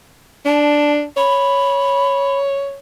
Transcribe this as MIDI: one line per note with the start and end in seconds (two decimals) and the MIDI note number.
0.45 1.05 62
0.45 0.91 81
1.17 2.79 73
1.17 2.39 83